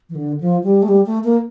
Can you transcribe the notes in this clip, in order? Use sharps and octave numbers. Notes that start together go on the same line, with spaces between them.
E3
D3
F3
G3
A3
G3
A3
A#3